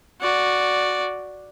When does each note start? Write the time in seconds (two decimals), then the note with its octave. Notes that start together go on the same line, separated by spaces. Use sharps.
0.21 F#4 D5